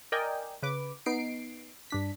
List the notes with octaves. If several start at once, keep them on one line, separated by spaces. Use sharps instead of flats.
A#4 D5 D#5 G5 G#5
C#3 B4 D6
B3 D#4 C7 D7
G2 D4 B6